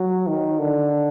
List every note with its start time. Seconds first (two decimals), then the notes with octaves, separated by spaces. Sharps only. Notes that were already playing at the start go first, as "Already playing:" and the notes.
Already playing: F#3
0.27 D#3
0.59 D3